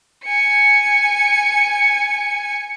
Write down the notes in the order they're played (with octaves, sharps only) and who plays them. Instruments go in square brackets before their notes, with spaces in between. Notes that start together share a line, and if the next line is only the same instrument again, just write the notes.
[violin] G#5 C#7